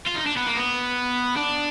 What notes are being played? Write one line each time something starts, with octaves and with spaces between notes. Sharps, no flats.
F4
D#4
D4
B3
A#3
B3
D4